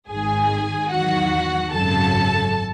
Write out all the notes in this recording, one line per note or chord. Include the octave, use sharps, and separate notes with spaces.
G#1 G#2 D#3 G#4 G#5
E2 D#3 F#3 F#4 F#5
G#1 F#2 C#3 F#3 A4 A5